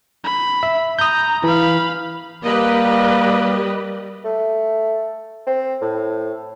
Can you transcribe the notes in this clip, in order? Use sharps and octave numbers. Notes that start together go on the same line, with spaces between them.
B5
E5
A#5 D#6 G6
E3 F5 B5
G3 A#3 G4 B4 D#5
A3
C4
A2